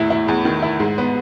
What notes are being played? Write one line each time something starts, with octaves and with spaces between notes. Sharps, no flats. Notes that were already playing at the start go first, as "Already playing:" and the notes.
Already playing: E2 A2 E4
E4
E2
D#3
E4
G#2
B3